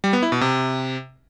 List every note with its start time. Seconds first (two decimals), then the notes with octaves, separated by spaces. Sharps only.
0.04 G3
0.13 B3
0.23 E4
0.32 B2
0.41 C3